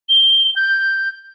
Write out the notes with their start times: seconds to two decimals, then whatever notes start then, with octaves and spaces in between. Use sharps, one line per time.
0.09 G7
0.56 G6